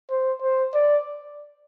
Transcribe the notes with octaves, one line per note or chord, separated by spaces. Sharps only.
C5
C5
D5